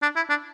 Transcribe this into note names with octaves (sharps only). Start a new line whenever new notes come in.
D4
E4
D4